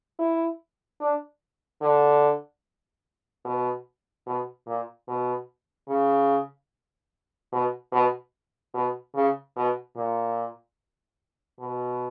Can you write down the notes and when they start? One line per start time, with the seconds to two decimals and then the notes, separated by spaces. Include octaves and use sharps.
0.19 E4
1.00 D4
1.82 D3
3.45 B2
4.26 B2
4.67 A#2
5.08 B2
5.89 C#3
7.52 B2
7.92 B2
8.74 B2
9.15 C#3
9.56 B2
9.97 A#2
11.59 B2